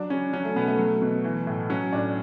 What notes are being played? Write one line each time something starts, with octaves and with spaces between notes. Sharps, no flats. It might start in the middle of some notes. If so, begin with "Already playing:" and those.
Already playing: F#3 D4
C#3 C#4
F#3 C#4
A3
B2 B3
A3
F#3
B2
E3
A2
F#3 C#4
A2 D4